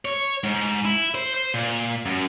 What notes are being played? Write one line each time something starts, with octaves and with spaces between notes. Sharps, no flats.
C#5
G#2
E4
C5
C5
A#2
F#2